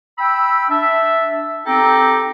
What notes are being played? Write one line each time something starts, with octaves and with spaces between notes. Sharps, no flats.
G5 B5 E6
D4 E5
C4 D#4 G4 A4 G5